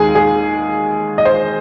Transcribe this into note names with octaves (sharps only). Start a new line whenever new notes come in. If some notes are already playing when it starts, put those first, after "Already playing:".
Already playing: D#2 D#3 G#3 G#4
G#4
D#5
C5